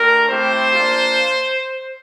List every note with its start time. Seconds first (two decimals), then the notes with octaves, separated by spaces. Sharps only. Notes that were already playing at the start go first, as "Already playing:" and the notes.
Already playing: A3 D4 G4 A#4
0.29 A3 C4 E4 G4 C5
0.75 A#3 D4 F4